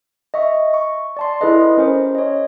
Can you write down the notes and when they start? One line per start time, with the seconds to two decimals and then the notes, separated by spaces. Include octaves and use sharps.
0.34 D#5 E5 C#6
0.74 C#6
1.17 D5 A5 C6
1.41 E4 G#4 A4 B4 D#5
1.77 C#4 A#4 C5
2.15 C#5 D#5